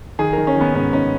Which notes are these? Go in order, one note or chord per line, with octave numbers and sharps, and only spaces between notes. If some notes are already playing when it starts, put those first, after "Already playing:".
D#3 G#4
D#3 A#4
C#4
D#3 B3
G#2 C#4
D#3 C#4